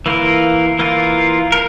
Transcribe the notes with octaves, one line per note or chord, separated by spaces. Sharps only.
E3 A#3 F4 A#4
E3 A#3 F4 A#4
A#4